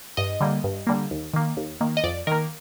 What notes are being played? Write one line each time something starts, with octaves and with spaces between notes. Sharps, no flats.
G2 D#5
D3 G3 A#3
G2
D3 G3 A#3
D#2
D#3 A#3
D#2
D#3 A#3
D#5
F2 D5
D#3 A#3 A#4